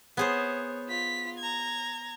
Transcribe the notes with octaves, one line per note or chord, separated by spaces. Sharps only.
B3 G#4 C5 C#5
F4 B6
A#5 G#6